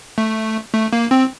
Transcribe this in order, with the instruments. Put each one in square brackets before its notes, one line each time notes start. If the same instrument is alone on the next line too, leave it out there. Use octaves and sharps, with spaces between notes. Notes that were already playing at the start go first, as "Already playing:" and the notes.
[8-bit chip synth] A3
A3
A#3
C4